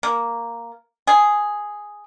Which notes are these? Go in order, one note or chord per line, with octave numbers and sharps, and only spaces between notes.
A#3
G#4